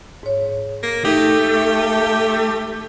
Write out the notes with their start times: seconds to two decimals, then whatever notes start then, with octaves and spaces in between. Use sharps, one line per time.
0.23 G#2 C#5
0.83 A#3
1.04 A3 D#4 G4